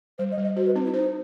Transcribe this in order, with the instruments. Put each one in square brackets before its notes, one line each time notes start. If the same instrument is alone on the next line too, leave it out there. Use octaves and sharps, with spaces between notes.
[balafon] G3 [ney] C5
[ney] D#5
[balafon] G3
[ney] D#5
[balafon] F#4 [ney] C5
[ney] B4
[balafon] C4 [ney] D#4
[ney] E4
[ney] D#4 [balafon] C5